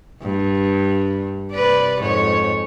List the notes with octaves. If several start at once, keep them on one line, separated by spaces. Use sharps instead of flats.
G2
C3 B4 D5
F2 G#2 C#5